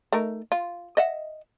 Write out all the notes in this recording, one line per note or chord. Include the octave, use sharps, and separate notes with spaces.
A3 D#4 A#4
F4
D#5 E5 F#5